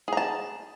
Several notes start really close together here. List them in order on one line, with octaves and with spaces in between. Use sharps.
G#4 A#5 A5